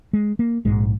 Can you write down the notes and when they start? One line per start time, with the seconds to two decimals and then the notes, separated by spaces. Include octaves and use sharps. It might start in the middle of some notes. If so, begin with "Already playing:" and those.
0.13 G#3
0.39 A#3
0.65 A#1 G#2 G#3